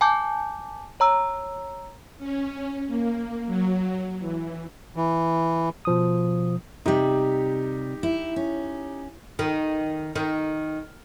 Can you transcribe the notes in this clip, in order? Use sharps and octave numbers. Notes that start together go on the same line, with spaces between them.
G#5 A5 D6 G6
C#5 A#5 E6
C#4
A#3
F#3
E3
E3
B2 F3 D#6
C3 G3 D#4 G4
E4
C#4
D#3
D#3